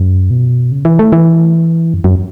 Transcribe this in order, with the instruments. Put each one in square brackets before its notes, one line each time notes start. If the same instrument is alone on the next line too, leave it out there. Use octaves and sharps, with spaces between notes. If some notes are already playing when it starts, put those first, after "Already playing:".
Already playing: [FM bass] F#2
B2
C#3
E3
A3
E3
F#2
F#2